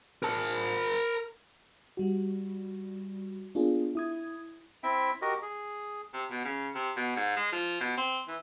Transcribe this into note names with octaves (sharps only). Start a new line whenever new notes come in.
A#4 A5
G3 F#4
A#3 B3 D4 F4 G#4
E4 D#6 G#6
C4 E4 E5 G5
F#4 G4 A#4 D#5
G#4
C3
B2
C#3
C3
B2
G#2
G#3
F3
B2
C4
E3